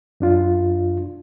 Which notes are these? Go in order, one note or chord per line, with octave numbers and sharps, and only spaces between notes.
F#2 D4 F4